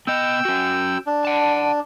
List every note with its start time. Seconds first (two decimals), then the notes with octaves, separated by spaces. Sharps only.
0.07 B3 D#5 G5 E6
0.45 C#4 F#4
1.06 D4
1.25 F#5 A5